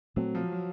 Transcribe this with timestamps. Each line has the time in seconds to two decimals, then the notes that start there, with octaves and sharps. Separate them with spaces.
0.16 A#2 F#3 A3 C4
0.35 F3
0.52 F#3